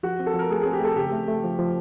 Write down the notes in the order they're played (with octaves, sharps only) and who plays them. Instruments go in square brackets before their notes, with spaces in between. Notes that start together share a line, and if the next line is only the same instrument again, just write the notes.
[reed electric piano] F3 [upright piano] F#4
[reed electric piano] C4
[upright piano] A4
[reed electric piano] F3 [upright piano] A#4
[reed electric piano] A3 [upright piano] G#4
[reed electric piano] C4 [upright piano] G#4
[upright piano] G4
[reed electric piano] A3 [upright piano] A4
[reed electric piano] C#3 [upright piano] G4
[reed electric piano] A3
A3
F3
F3